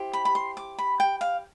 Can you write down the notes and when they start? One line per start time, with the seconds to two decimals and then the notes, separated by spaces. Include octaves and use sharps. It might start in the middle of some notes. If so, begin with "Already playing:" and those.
Already playing: E4 G4 C5
0.13 B5
0.25 B5
0.35 C6
0.57 D6
0.78 B5
1.00 G5
1.21 F5